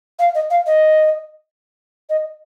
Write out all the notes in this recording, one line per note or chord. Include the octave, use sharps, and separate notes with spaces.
F5
D#5
F5
D#5
D#5